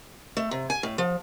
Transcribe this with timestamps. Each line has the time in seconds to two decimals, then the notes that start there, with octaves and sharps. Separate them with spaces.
0.37 A3
0.51 C3
0.70 G#5
0.83 A2
0.98 F3